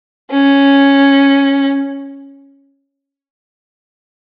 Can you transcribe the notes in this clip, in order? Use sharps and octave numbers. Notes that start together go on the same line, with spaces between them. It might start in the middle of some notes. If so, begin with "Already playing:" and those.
C#4